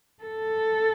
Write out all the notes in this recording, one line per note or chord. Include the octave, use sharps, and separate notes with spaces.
A4